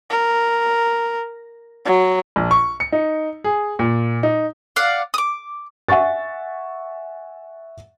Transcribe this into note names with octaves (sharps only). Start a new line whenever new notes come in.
A#4
F#3
A#1
C#6
C#7
D#4
G#4
A#2
D#4
D5 F5 F#5
D6 D#6
E5 F#5 G#5 C#6 A6